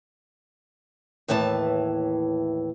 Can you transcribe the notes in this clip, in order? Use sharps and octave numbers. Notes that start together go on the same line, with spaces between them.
D#2 A2 E3 B4 A5